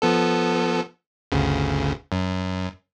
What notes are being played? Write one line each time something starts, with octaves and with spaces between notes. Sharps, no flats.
F3 B3 A4
G1 D2 C#3
F#2